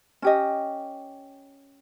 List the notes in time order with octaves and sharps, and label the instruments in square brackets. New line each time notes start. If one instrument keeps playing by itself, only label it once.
[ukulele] C#4 G4 D#5